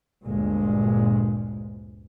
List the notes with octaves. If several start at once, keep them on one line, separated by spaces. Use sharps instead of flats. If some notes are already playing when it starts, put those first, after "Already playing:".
G1 D2 A#2 G#3